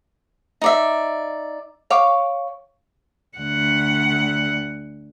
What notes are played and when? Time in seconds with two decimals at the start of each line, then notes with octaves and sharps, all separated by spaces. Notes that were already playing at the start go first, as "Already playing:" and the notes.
0.62 D#4 D5 E5
1.90 C#5 F5 D6
3.38 D2 F#5